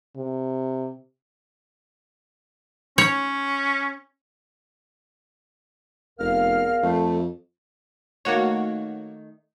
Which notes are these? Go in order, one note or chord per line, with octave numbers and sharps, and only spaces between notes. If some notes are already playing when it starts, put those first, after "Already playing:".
C3
C#4 C#5
F1 E2 A#4 F5 F6
F2 A3
D#3 A3 A#3 D#4 F#4 C#5